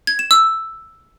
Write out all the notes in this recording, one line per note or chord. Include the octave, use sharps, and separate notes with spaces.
G#6
E7
E6